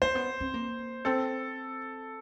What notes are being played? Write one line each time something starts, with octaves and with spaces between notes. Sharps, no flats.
A#3 C5
B3
C4
A#3
C4 A4